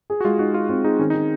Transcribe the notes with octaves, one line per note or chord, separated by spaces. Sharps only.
G#4
F#4
G#3 F4
D#4 F#4
F4 G#4
C4 F4
D#4 G#4
D#3 C#4
D#4
D#3